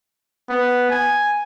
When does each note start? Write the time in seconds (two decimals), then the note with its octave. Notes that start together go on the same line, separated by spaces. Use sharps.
0.49 B3
0.90 G#5